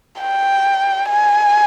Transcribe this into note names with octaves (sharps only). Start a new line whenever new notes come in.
G5
G#5